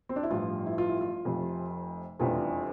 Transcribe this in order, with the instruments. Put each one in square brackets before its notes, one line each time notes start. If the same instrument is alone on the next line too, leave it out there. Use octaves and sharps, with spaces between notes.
[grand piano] C4
D4
E4
[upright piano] A1 G2 F3 [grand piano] F4
[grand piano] E4
F4
E4
F4
[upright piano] F1 F2 C3
[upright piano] F1 E2 C3 G3 D4 [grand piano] F4